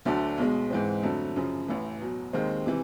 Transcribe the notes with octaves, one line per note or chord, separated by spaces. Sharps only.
D2 D3 F#3 A3 D4
B1 B2 G#3
G#2 E3 G#3 C4
F2 D3 F#3 A3
F#2 C#3 F3
A1 A2 E3
E2 B2 F#3
D#2 D#3 G#3 C4
C3 E3